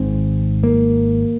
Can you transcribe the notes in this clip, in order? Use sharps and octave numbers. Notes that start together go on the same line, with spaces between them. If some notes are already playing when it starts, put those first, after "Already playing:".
Already playing: G#1 G#2 C4
A#3